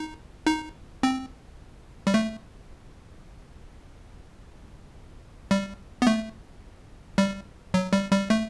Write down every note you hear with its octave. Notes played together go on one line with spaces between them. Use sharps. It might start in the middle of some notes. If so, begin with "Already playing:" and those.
Already playing: D#4
D#4
C4
G3
A3
G3
B3
A3
G3
F#3
G3
G3
A3